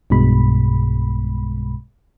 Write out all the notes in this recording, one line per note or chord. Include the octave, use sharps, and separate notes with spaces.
B1 G2 B2 G#3 B5